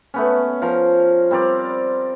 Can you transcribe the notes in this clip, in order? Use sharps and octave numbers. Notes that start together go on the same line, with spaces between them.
A3 B3 C#4
F3 A#4
G3 C4 A#4 D5